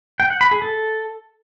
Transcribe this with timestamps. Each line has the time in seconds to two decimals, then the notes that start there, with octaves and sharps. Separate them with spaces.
0.20 G5
0.30 F#5
0.41 B5
0.51 G#4
0.62 A4